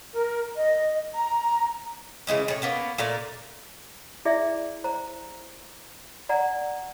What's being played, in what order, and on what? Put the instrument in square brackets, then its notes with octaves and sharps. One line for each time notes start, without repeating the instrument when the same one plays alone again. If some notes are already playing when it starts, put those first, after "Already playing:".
[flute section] A#4
D#5
A#5
[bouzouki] C#3 E3 G#3 C#4
A2 C#5
A#3 B3 C#4
A#2 A3 A#4 D5
[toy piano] E4 G#4 D5 E5
C5 A#5
D5 F#5 G#5 A#5